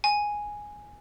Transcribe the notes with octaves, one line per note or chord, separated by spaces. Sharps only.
G#5